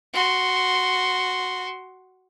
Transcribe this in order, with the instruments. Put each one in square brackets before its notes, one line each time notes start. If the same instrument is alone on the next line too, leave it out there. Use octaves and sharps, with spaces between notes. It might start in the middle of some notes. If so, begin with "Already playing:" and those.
[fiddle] F#4 C6